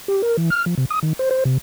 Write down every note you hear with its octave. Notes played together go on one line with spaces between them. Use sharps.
G4
A#4
E3
F6
F3
C3
D#6
D#3
C5
C5
C3